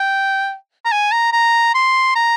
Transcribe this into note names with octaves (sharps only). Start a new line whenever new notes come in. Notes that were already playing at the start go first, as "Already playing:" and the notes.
Already playing: G5
A#5
G#5
A#5
A#5
C6
A#5